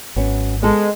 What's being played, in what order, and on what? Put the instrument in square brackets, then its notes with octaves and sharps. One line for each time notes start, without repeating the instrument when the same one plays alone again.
[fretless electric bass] G#1 [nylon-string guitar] F#3 B3 C#4
[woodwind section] G#3 [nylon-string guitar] B3 G#4 A4